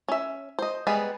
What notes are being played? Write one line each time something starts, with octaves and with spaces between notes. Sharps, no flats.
C#4 E5
C5 D#5
G3 G#3 B3 G#4